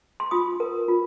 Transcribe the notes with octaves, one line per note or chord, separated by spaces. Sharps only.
C6
F4 D#6
A#4
F4